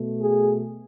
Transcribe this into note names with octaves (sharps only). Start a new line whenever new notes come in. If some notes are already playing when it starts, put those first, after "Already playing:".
Already playing: B2 A3
G#4